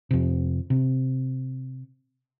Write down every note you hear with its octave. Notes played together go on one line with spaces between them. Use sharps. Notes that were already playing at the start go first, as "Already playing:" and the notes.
F2 C3
C3